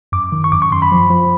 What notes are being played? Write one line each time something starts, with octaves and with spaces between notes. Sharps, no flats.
F#2 D6
D#3
C#6
F#2 D6
C#6
F#2 C6
B5
F3
F3